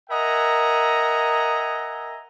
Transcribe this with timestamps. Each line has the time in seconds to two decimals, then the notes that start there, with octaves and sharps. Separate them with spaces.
0.10 A#4 D#5 E5 F#5 G#5 A#5